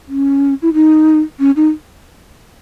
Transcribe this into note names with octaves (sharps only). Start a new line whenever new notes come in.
C#4
E4
D#4
C#4
D#4